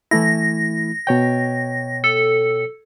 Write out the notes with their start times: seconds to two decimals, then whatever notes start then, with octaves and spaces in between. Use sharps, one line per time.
0.11 E3 A3 E4 A#6
1.07 B2 C#5 G5
2.04 A4